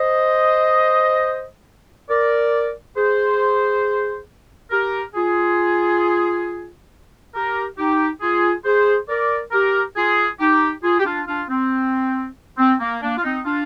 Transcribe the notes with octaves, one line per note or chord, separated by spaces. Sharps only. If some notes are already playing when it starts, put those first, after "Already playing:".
Already playing: C5 D#5
A#4 D5
G#4 C5
G4 A#4
F4 G#4
G4 A#4
D#4 G4
F4 G#4
G#4 C5
A#4 D5
G4 A#4
F4 G#4
D#4 G4
F4 G#4
G4
D4 F4
D4 F4
C4
C4
A#3
A#3 D4
F4
C4 D#4
D4 F4